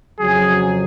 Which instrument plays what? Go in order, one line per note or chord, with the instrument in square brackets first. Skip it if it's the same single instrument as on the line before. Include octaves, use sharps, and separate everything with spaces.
[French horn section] F2 C#3 F#3 [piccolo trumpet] G#4